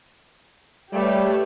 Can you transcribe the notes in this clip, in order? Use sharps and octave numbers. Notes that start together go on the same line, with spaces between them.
G3 A3 G4 B4 C#5